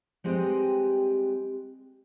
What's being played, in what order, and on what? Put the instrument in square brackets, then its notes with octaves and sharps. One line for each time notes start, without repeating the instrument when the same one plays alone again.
[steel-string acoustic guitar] G3 G#3 C4 G4 B4 D#5